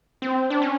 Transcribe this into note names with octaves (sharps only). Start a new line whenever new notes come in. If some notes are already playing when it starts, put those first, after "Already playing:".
C4
D4
C#4